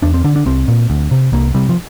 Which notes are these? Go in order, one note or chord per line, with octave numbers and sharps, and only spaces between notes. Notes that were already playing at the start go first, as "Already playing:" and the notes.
E2 D4
C4
D3 D4
D4
C2 C4
A#2
D2
C3
C2 A#3
C3 G3
F3